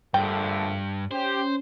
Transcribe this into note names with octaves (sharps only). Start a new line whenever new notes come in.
A#1 G2 D3 A3 G5
C#4 G4 C5